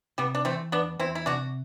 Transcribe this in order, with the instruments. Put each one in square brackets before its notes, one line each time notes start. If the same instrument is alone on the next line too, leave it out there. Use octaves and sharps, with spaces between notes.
[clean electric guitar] C3 [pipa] G3 B3
[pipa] D4
[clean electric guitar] E3 [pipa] A3 C4
[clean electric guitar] E2 [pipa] B3 D4
[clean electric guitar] E2 [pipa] C4 E4
[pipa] E4
[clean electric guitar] C3 [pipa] D4 F#4